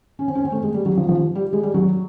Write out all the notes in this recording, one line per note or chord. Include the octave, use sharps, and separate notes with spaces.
C#4
C4
C#4
C4
A3
G#3
G3
F#3
F3
F3
G3
G#3
G3
F#3